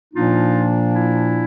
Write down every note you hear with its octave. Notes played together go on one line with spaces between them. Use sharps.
A#2 F3 A#3 D4 D#4 F4
E4